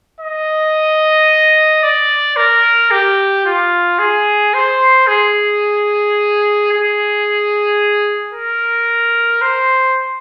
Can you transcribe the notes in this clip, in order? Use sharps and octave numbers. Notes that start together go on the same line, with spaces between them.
D#5
D5
A#4
G4
F4
G#4
C5
G#4
G#4
A#4
C5